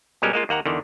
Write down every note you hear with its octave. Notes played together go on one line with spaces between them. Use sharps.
B2 G3 G#3 C#4 A#4
G#3 A#3 F4
D#2 A#3 F#5 A#5
E2 D3 D#3